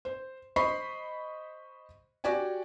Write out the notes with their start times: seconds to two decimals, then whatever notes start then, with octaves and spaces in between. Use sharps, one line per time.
0.05 C5
0.56 C5 D#5 B5 C#6 C7
2.24 F#4 G4 D5 G5 G#5